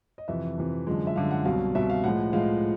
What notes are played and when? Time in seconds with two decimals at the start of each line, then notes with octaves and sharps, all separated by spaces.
0.18 D#5
0.28 F2 C3 E3 E5
0.58 F2 C3 E3
0.87 F#2 D3 F3 G#3
1.07 E5
1.16 F#2 D3 F3 G#3 F5
1.31 F#5
1.45 C2 B2 F#3 F5
1.75 C2 B2 F#3 E5
1.90 F5
2.04 A2 F3 G#3 F#5
2.33 A2 F3 G#3 F5